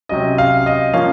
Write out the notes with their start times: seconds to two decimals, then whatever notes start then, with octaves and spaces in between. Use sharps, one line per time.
0.09 C3 F#3 C#4 D#5
0.38 F5
0.66 D#5
0.93 F3 A#3 C#4 F5